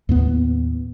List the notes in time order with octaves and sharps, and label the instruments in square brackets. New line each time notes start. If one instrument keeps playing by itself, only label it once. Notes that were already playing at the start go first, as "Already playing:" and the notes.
[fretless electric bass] D#2 A2 B3